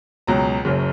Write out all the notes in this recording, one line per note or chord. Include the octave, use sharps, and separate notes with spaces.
C#2 B2 F#3 A#5
F#1 F#2 C#3